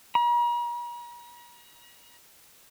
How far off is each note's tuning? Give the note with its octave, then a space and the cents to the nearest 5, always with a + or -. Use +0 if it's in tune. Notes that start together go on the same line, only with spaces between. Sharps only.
A#5 +45